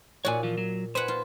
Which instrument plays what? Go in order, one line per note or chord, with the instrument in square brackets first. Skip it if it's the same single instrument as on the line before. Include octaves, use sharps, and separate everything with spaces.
[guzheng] A#2 F#4 [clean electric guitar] C#5 D5 G#5
[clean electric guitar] E3 F3 F4
F#3
[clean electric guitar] B4 C5 [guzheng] F#5 G#5
[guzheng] F4